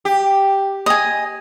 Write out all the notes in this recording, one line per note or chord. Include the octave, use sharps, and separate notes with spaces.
G4
D#5 G#5